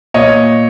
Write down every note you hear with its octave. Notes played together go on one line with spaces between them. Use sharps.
A#2 C#5 D#5